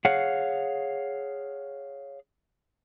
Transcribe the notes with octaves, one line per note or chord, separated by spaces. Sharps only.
G#4 C#5 F5 F#5